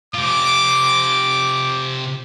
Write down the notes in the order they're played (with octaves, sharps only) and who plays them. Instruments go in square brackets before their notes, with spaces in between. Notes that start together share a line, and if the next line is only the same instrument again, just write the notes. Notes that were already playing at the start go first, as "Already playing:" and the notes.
[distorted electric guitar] C3 F4 [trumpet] D6